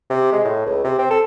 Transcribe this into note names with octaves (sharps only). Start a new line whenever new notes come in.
C3
G#3
A2
C#2
C3
C4
A4